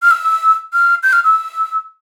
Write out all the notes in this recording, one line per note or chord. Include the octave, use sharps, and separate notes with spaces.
F6
E6
F6
G6
F6
E6